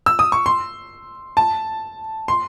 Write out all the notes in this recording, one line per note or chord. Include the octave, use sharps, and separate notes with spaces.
E6
D#6
C#6
C6
A5
C6